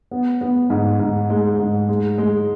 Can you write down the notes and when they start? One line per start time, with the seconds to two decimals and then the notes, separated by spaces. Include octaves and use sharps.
0.11 B3
0.41 B3
0.70 G#2
0.99 G#2
1.30 G#3
1.60 G#2
1.89 G#3
2.18 G#3